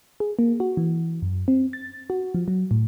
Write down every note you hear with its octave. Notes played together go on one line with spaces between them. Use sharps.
G#4
A#3
F#4
E3
F#2
C4
A6
F#4
F3
F#3
A2